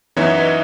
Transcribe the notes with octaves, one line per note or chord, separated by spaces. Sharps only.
F#2 E3 B3 D#4 C#5 E5
B4 D#5